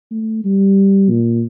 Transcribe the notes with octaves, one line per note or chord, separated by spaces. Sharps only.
A3
G3
A#2